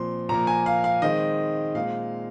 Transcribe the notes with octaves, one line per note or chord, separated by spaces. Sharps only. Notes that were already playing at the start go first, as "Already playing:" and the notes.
Already playing: A#2 F3 C4 C6
A#2 F3 A#3 A#5
G#5
F5
F5
D#3 G#3 C4 D#5
A#2 G#3 C4 F5